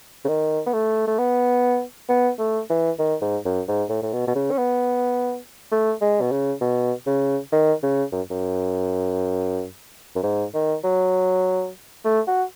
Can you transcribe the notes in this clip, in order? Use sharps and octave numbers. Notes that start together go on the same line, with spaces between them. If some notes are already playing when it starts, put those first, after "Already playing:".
C#3
D#3
B3
A3
A3
B3
B3
A3
E3
D#3
G#2
F#2
G#2
A2
A2
B2
B2
C#3
C#4
B3
A3
G#3
B2
C#3
B2
C#3
D#3
C#3
F#2
F#2
F#2
G#2
D#3
F#3
A3
F#4